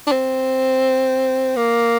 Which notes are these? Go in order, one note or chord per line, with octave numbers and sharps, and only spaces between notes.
D4
C4
A#3